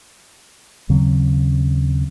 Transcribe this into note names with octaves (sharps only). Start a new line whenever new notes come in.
D#2 C#3 F#3 C4